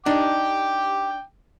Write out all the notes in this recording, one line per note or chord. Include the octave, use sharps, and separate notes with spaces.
D4 D#4 G5 D6